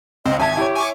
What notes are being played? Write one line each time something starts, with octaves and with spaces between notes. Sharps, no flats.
C#2 C4 D#5
G#1 E5 G#5 A5 G#6
E4 G4 C#5
G#5 C#6 D6